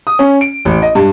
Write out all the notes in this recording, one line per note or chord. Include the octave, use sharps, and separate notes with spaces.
D#6
C#4
D7
A1
D#5
G2